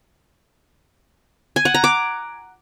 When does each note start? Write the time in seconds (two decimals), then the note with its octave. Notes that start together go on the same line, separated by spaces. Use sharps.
1.56 G#5
1.65 F#5
1.74 A#5
1.84 D6